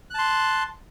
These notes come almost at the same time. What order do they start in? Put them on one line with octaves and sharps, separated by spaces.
F#6 A5 C6